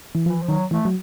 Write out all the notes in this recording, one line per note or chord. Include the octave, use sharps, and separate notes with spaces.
E3
E3 F3
F3
D#3 F#3
E3 A3
F#3